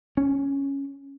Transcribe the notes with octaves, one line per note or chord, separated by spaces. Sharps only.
C#4